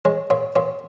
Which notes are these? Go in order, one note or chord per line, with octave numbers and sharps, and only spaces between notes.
G#3 C#5
A#2 C#5
A#2 C#5